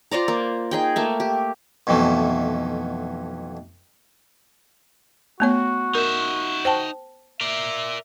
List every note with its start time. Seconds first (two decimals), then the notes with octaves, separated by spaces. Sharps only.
0.11 F4 C5 D5 A#5
0.28 A#3
0.71 D#4 G#4 G5
0.96 A3 A#3 E5
1.20 G4
1.87 B1 F2 B2 E3 A3
5.40 A3 B3 F#4 C#5
5.95 D#4 A#4 E5
6.65 C5 G5 A5
7.41 A#4 D5 E5